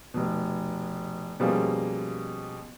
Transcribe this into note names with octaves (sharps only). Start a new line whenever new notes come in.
F1 B2
B2 F3 G3 G#3 A#3 C#4